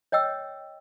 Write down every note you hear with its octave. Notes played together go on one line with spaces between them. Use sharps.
C#5 D#5 G5 E6